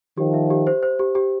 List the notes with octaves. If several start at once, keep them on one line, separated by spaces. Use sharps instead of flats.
D#3 F3 G4
E5
G4
C5
C5
G4
G4